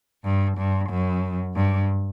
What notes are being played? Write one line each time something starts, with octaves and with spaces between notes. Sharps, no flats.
G2
G2
F#2
G2